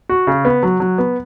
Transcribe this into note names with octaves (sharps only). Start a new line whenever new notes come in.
F#4
C#3
B3
F#3
F#3
B3